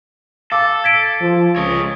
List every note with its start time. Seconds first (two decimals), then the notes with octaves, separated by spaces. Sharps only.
0.52 A4 F5 D6 E6
0.84 G#6 B6 D7
1.21 F3
1.56 C#2 C#5 D#5